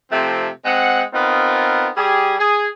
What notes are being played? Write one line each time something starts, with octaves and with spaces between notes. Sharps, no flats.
C3 F3 A3 C4
G#3 C4 F#5
B3 C4 D#4 F4 A#4
G3 G4 G#4
G#4